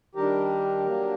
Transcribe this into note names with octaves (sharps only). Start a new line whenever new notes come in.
D#3 G3 D4 G4 A#4
F#3 A#3 D4